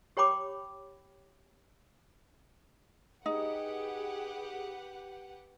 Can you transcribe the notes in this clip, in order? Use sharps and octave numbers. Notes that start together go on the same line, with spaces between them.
G4 C#5 G5 B5 D6
D#4 G4 G#4 B4 F#5